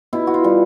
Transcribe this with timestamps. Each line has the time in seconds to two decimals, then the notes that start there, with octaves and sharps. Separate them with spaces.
0.13 B2 E4
0.27 F#4
0.34 F4
0.44 G3